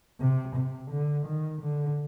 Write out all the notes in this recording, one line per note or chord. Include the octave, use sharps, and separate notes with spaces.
C3
C3
D3
D#3
D3